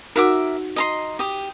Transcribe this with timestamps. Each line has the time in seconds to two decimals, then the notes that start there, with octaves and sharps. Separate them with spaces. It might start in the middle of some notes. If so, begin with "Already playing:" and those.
0.16 D#4 F#4 A#4 E5 F#5 D6
0.76 D#5 A#5 C6
1.19 G4 D#6